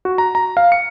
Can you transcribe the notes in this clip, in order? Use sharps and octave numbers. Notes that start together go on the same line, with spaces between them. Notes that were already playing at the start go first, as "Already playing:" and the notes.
F#4
A#5
A#5
F5
C#7